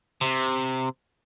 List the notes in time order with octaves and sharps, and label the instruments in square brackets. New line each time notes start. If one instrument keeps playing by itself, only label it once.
[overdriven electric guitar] C3